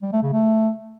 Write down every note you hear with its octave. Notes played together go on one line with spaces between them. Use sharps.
G3
A3
C#3
A3